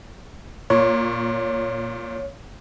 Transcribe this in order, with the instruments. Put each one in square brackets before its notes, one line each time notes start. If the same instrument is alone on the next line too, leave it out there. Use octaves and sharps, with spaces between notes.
[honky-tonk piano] A#2 [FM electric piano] C#5